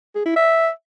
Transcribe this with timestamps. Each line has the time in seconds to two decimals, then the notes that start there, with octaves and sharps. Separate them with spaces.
0.15 G#4
0.26 E4
0.36 E5